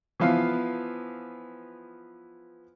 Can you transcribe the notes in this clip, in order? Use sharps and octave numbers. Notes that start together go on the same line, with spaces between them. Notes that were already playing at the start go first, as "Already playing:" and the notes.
E3 F3 B3 F5